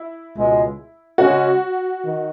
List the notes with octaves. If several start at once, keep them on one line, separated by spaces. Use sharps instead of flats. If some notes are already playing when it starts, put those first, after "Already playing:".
Already playing: E4
C#2 B2 G#3
C#3 G#3 C#4 F#4
D#3